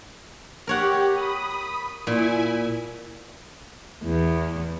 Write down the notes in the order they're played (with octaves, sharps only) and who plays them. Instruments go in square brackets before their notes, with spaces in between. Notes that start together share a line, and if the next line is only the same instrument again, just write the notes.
[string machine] G4 [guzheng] A#4 C#5 F#5
[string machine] B5 D#6
[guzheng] A#2 [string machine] E4 G#5
[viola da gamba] E2